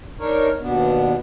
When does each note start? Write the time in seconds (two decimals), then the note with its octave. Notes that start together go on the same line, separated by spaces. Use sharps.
0.19 D4 D#4 A#4 C#5
0.61 D#2 B2 B3 D4